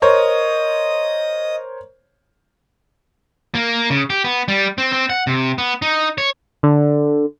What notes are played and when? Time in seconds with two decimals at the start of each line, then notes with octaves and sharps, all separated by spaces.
0.02 A#4 C5 C#5 D#5 D#6
3.55 A#3
3.90 C#3
4.10 G4
4.24 B3
4.48 G3
4.78 C4
4.92 C4
5.10 F#5
5.27 C3
5.58 B3
5.82 D#4
6.18 C#5
6.63 D3